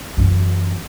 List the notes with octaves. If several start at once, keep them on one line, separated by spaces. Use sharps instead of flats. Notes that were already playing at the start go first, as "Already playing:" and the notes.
F#2 E3